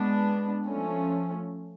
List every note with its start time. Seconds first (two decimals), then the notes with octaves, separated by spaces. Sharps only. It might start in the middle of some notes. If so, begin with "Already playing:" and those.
Already playing: G#3 B3 D4
0.67 F3 A3 C#4